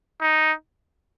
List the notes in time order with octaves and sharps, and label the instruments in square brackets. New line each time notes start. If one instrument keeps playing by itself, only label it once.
[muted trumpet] D#4